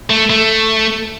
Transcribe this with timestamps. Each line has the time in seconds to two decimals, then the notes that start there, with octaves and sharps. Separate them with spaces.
0.10 A3
0.30 A3